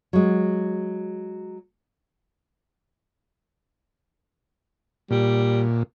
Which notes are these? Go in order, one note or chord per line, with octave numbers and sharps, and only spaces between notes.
F#3 G#3
A#2 G3